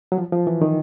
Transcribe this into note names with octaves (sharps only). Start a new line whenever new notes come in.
F#3
F3
F3
E3
D#3